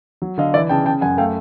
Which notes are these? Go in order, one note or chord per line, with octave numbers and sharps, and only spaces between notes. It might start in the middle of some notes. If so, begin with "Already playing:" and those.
F#3
D3 D#5 F5
E3 D5 E5
C#3 G5 A5
C#3 G5 A5
F#2 F#5 G#5
A3 F5 G5